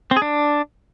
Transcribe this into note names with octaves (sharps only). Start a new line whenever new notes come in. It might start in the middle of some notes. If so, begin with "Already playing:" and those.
C4
G#4
D4